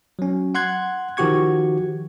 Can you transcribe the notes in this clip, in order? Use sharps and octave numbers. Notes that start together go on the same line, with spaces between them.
F#3 C#4
F#5 C6 F#6 G#6
D#3 F3 F#4 G4 C#6 G#6